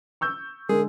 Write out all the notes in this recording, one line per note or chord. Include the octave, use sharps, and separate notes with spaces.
C#6 E6 G6
D3 G#3 G#4 A#4